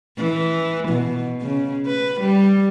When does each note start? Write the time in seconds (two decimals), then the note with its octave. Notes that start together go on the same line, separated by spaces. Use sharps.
0.17 E3
0.89 B2
1.41 C#3
1.86 B4
2.21 G3